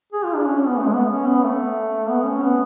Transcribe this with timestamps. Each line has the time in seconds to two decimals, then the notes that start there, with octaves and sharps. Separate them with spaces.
0.13 G#4
0.24 F4
0.35 D4
0.46 C#4
0.57 C#4
0.68 B3
0.78 A3
0.87 G#3
0.95 B3
1.11 C#4
1.27 B3
1.44 A3
2.10 B3
2.25 C#4
2.42 B3